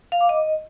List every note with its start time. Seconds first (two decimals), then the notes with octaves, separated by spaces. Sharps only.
0.12 F5
0.21 D6
0.29 D#5